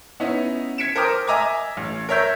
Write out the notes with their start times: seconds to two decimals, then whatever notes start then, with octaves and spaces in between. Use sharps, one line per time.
0.20 B3 C#4 D#4 E4
0.78 G#6 B6 C#7 D7 E7
0.96 A#4 C5 G5 D6 D#6 F6
1.27 D#5 E5 G#5 A#5 D6 G#6
1.77 A1
2.09 A#4 C#5 E5 G6 B6